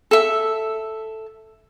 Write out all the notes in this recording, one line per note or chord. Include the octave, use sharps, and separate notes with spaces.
A4 E5